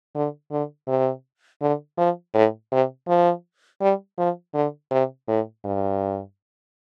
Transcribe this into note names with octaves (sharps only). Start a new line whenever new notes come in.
D3
D3
C3
D3
F3
A2
C3
F3
G3
F3
D3
C3
A2
G2